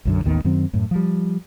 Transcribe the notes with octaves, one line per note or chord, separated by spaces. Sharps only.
B1 F#2 D3
A1 D#2 D#3 B3
F#2 D#3 F#3 C4
F#2 A2
F3 G3